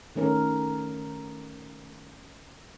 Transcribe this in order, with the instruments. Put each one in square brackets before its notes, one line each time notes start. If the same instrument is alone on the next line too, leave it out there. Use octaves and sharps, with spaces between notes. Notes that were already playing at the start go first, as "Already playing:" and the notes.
[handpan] D#3 A3 C#4 A#4